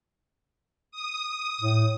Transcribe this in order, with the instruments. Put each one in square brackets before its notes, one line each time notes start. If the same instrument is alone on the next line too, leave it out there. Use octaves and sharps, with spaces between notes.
[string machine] D#6
[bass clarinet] A2